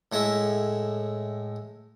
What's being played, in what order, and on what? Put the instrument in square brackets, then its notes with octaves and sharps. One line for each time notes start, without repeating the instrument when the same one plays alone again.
[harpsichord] A2 G#3 E5